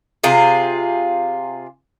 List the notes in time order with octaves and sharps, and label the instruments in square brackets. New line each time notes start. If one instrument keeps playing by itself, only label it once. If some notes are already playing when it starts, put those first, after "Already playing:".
[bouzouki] C3 F4 G#4